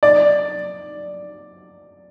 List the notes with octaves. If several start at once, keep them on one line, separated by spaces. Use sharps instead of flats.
D5